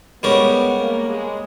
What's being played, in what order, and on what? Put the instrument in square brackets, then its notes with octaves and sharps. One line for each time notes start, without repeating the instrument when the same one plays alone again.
[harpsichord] G#2 G3 C#4 G4 A#4 [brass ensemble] B3
[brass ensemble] A#3
G#3